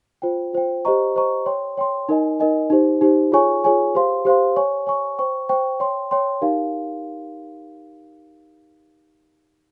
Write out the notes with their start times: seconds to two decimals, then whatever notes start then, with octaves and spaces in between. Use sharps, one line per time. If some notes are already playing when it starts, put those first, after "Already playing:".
0.22 F4 C5 G5
0.53 F4 C5 G5
0.85 G4 C5 D#5 A#5 C#6
1.15 G4 C5 D#5 A#5 C#6
1.46 C#5 G5 C6
1.77 C#5 G5 C6
2.09 D#4 A#4 D#5 G#5
2.40 D#4 A#4 D#5 G#5
2.70 D#4 G4 C5
3.01 D#4 G4 C5
3.32 F4 G#4 C#5 G#5 C#6
3.64 F4 G#4 C#5 G#5 C#6
3.95 G4 C5 F5 C6
4.25 G4 C5 F5 C6
4.56 C#5 G#5 C#6
4.87 C#5 G#5 C#6
5.18 C5 G5 C#6
5.49 C5 G5 C#6
5.80 C#5 G5 C6
6.11 C#5 G5 C6
6.42 D#4 G4 A#4 F5